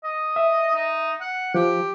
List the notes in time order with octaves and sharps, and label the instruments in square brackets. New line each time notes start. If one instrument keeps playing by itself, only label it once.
[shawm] D#5
[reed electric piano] E5
[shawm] D#4
F#5
[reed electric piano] F3 [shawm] G4